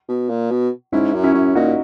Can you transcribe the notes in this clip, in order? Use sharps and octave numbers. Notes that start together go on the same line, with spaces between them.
B2
A#2
B2
G#2 C#4 E4
F#2
C#4 E4
F#2
A#2 D#4 F#4